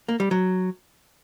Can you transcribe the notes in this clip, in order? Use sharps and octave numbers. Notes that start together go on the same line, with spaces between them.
A#3
G3
F#3